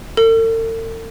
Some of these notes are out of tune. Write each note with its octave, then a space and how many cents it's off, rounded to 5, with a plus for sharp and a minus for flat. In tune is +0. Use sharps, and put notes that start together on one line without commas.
A4 +45